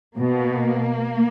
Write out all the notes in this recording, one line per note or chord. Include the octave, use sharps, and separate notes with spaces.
B2 A#3